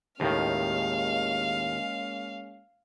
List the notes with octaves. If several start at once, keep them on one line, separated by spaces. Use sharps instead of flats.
D#2 A2 D#3 G#3 A#3 C#4 F5